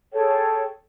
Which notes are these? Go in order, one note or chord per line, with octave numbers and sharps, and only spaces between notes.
G#4 A4 C#5 G5